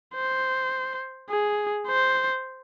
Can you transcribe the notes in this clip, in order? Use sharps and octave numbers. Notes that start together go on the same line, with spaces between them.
C5
G#4
C5